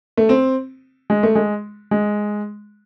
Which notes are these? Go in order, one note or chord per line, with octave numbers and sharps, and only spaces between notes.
A3
C4
G#3
A3
G#3
G#3